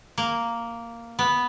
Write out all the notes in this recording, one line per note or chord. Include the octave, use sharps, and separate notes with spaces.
A#3
B3